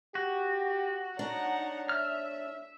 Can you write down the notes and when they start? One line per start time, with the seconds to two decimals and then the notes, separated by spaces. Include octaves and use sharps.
0.15 F#4 G4
1.19 D4 D#4 C#5 F#5 A#5
1.89 E5 F6